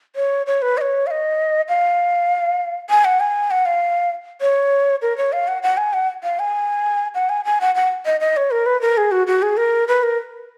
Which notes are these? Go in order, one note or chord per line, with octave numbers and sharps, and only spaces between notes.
C#5
C#5
B4
D#5
C#5
F5
D#5
F5
G#5
F#5
G#5
F#5
F5
C#5
A#4
C#5
F5
F#5
F#5
G#5
F#5
F5
G#5
F#5
G#5
G#5
F#5
F#5
D#5
D#5
C#5
A#4
B4
A#4
G#4
F#4
F#4
G#4
A#4
B4
A#4